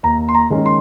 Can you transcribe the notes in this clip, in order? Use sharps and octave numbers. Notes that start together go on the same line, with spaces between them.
D#2 A#5
C6
A#5
D#3 G#3 C#4
C6